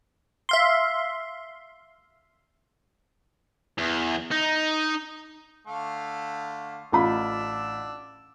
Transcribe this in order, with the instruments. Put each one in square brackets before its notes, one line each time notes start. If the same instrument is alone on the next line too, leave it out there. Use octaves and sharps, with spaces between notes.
[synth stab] E5 F5 C6
[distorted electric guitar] E2
D#4
[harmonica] D3 A3 F5
[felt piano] A1 F4 B5 [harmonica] D4 E6